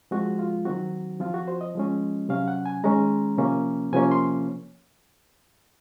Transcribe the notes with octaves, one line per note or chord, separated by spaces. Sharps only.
F3 G#3 C4 F#4
F4
D#3 F#3 C4 F#4
F3 C4 F4
F#4
C5
D#5
F3 G#3 C#4
C3 F#3 C#4 F5
F#5
G#5
D#3 G#3 C#4 A#5
C3 F3 A#3 C#4
C3 F3 A#3 C#4 G#5
C6